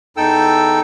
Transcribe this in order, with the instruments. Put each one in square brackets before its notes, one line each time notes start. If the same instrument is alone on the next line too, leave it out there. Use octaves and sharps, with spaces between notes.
[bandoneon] E2 D#4 A4 G5 E6